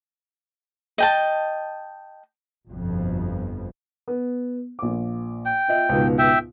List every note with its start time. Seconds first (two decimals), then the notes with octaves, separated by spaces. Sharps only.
0.98 D#5 G5 A5
2.71 G1 F2 B2 F3
4.08 B3
4.79 A#1 D6
5.46 G5
5.68 F4 D#5 E5
5.89 C#2 G#2 B2
6.18 E5 G5